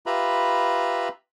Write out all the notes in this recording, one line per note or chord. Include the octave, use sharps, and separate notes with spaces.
F4 G4 B4 E5 A#5 B5